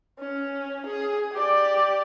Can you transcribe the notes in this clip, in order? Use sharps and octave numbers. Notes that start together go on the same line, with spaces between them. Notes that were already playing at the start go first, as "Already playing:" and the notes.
C#4
G#4
G4 D5